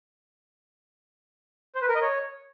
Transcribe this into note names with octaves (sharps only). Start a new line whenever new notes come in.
C5
B4
A#4
D#5
C#5